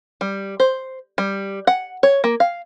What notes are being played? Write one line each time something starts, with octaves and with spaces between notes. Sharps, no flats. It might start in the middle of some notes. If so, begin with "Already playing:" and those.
G3
C5
G3
F#5
C#5
A#3
F5